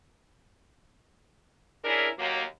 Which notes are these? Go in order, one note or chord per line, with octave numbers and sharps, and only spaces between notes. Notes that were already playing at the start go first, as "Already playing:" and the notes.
C#4 D4 E4 G#4 A#4
D#2 F#3 A#3